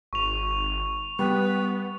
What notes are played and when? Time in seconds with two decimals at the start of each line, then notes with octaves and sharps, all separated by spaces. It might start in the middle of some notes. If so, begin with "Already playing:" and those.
0.13 G#1 C#6 F7
1.19 G3 B3 B4